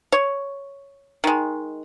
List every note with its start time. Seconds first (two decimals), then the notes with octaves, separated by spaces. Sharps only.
0.12 C#5
1.24 D#3 G#3